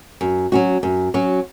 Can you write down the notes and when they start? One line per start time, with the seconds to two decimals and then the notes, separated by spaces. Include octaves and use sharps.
0.21 F#2
0.52 F#3 C#4 F#4
0.83 F#2
1.14 F#3 C#4 F#4